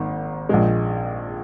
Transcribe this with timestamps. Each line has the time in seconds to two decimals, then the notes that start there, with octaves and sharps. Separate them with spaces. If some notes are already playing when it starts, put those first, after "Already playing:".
Already playing: G#1 G#2 D#3 A#3
0.49 A#1 A#2 G#3